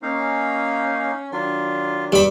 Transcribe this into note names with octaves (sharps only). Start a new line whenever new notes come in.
A#3 C#4 D#4 F5
D#3 F#3 D4 F4
G2 B5